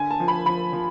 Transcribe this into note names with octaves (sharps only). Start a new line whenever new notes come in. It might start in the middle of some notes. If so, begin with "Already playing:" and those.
Already playing: D3 G#5
A5
F3
B5
F3 B5
F3